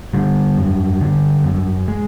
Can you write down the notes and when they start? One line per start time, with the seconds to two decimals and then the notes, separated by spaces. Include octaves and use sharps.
0.14 D3 G3
0.57 F#2
1.01 D3
1.44 F#2
1.88 G#3